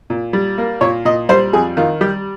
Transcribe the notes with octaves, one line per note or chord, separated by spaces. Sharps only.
A#2
G3
A#3
A#2 C#5
A#2 D#5
G3 C5
F2 G#4
D#3 F4
G3 G4